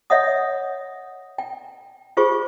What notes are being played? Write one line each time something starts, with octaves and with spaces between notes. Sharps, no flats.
C#5 D#5 E5 F#5 D#6
G5
F4 G4 G#4 C5 C#6